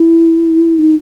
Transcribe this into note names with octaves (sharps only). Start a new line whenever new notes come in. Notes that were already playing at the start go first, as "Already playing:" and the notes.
Already playing: E4
D#4